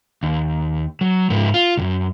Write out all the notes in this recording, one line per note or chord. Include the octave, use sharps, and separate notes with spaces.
D#2
F#3
G#2 F3
F4
C2 F#2